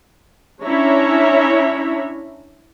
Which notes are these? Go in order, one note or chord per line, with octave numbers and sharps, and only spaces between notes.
C#4 D4 E4 C#5 E5 A#5